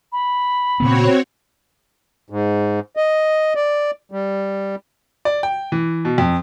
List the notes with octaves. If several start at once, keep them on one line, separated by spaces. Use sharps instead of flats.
B5
A#2 C#3 B3 C4 F#4 C#5
G#2
D#5
D5
G3
D5
G5
E3
B2
F2